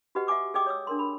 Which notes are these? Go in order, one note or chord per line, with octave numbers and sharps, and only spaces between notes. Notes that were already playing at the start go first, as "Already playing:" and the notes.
F#4 G4 B4 D#5 F#5
E5 F#5 G#5 D6 D#6
G#4 D5 D#5 G5 D6 D#6
C#5 D#6 E6
D4 A#4 C6
A#4 B5